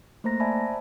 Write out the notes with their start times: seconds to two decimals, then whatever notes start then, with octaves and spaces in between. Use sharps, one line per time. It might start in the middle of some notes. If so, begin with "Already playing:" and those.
0.24 A3 A#3 C5 A#5 A#6
0.40 C5 D5 E5 G#5 A5 B5